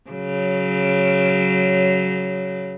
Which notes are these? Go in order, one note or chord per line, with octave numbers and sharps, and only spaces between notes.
C#3 F#3